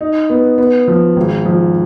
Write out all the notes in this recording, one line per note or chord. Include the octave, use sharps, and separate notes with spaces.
D#4
B3
B3
F3
G#1
F3